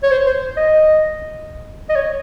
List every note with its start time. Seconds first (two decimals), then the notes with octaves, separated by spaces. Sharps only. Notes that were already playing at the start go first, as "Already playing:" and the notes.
0.03 C#5
0.11 C5
0.27 C5
0.57 D#5
1.89 D#5
1.96 C#5